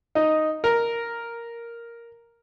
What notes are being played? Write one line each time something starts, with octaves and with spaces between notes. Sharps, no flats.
D#4
A#4